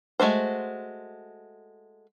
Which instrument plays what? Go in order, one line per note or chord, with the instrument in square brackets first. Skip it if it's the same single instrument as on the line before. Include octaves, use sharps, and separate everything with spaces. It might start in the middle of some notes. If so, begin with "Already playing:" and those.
[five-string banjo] G#3 A3 F#4 C5